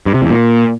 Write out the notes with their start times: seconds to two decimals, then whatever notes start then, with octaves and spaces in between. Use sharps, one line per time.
0.06 G2
0.14 C3
0.22 E2
0.30 A#2